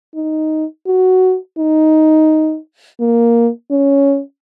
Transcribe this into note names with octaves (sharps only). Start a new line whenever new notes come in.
D#4
F#4
D#4
A#3
C#4